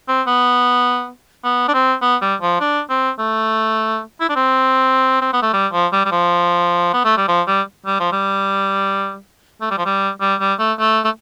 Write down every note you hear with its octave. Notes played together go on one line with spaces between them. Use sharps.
C4
B3
B3
D4
C4
B3
G3
F3
D4
C4
A3
E4
D4
C4
C4
B3
A3
G3
F3
G3
G3
F3
B3
A3
G3
F3
G3
G3
F3
G3
A3
G3
F3
G3
G3
G3
A3
A3
A3